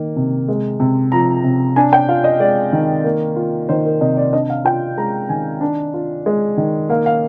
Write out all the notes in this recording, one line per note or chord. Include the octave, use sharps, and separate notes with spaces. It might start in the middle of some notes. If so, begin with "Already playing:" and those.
Already playing: D#3 A#3
C3
G#3
C3
F3 A#5
C3
D4 G#5
G5
F4 F5
D#5
G#3 D5
D#3
A#3
F4
D#3 C5
A#4
C3 D#5
D5
D4 D#5
F5
F4 G5
G#3 A#5
D#3 G#5
D4
F4
G#3
D#3
A#3 F5
F5